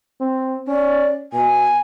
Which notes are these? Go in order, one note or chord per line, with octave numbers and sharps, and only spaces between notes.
C4
C#4 D5
B2 G#5